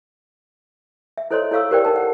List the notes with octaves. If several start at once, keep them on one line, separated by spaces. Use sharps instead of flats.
E5
E4 A4 C5 C#5 D#5 C6
E4 A4 C#5 F5 C#6 E6
G4 A#4 C5 D5 G5
D#4 A#4 A5
F#5